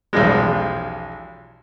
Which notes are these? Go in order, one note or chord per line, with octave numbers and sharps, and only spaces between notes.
B1 E2 C#3 F3 G3 G#3